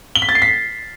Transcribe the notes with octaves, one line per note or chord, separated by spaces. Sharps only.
G7
B6
A6
C7
B6